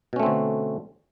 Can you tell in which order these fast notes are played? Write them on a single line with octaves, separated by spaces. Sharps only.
B2 C#4 A3 C4 D3